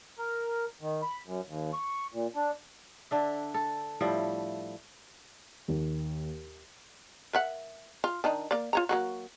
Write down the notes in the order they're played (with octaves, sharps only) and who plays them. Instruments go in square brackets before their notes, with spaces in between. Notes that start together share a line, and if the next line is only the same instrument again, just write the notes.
[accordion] A#4
D#3
B5
F#2
D#2
C#6
A#2
D4
[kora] D3 D4 E5
A4
A2 F3 G3 E4
[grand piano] D#2
[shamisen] A#4 E5 F#5
F4
D#3 D4 D#4
A#3 D5
F4 C#5 A#5
F#3 A#3 F#4